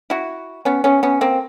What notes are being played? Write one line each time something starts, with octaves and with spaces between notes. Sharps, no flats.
E4 F#4
B3 C#4
B3 C#4
B3 C#4
A#3 C4